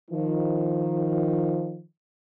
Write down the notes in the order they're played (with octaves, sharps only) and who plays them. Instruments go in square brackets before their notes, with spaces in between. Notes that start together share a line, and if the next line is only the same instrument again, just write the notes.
[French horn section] D#3 F3